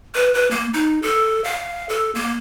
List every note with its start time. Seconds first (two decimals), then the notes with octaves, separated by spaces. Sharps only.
0.14 B4
0.34 B4
0.51 A#3
0.74 D#4
1.02 A4
1.44 F5
1.89 A4
2.15 A#3